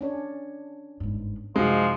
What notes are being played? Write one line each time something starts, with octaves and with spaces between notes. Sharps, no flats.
C#4 D4 C#5
G1 G#2
F#2 C3 F3 G#3 D#4 F#4